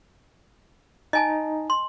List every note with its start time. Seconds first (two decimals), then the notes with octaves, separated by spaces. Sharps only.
1.13 D#4 D#5 G#5 A5
1.70 C6